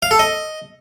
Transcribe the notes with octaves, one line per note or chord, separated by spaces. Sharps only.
F5
A4
D#5